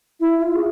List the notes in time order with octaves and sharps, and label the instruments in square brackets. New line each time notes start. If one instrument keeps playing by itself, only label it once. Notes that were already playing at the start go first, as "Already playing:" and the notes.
[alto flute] E4
F4
G#4